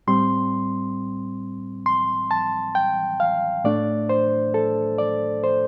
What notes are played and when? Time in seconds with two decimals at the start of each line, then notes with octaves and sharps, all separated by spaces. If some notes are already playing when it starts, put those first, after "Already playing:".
0.07 A2 G3 C4 C6
1.86 C6
2.31 A5
2.75 G5
3.20 F5
3.64 A2 A3 D4 D5
4.09 C5
4.54 A4
4.98 D5
5.44 C5